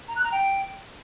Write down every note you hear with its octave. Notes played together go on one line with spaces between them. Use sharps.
A#5
F#6
A#5
G5